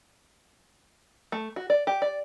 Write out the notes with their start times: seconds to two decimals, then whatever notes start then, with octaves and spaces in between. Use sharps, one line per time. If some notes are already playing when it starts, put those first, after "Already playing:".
1.32 A3
1.56 F#4
1.70 D5
1.87 G4
2.02 D5